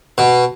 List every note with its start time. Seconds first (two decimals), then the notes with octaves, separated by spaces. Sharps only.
0.18 B2